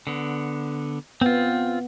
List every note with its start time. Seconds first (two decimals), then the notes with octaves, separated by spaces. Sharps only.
0.07 D3 B3
1.21 B3 C4 F4